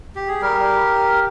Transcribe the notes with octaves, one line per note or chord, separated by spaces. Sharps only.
G4
G#4
G3 G4 A#4